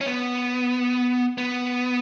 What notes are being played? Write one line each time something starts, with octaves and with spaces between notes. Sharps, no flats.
C#4
B3
B3